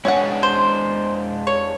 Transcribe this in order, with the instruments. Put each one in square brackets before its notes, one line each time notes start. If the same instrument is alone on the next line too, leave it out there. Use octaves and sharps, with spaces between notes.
[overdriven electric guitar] G#3 D4 [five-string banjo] C#4 G#4 F#5
[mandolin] C5
C#5